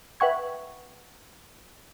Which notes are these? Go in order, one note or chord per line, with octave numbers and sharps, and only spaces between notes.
B4 E5 F#5 G5 C#6 G#6